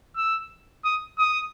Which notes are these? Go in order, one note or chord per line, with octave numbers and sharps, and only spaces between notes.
E6
D#6
D#6